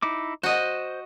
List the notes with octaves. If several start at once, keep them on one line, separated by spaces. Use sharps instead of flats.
D#4 E4 D6
F#4 C5 D#5